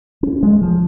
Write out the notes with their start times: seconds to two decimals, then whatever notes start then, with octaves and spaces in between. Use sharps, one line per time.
0.23 C#4
0.43 G#3
0.62 F3